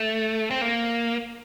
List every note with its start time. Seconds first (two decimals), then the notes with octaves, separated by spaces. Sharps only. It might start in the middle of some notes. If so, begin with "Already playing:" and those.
Already playing: A3
0.51 C4
0.61 A#3